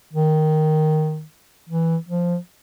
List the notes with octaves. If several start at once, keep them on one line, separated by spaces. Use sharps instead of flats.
D#3
E3
F3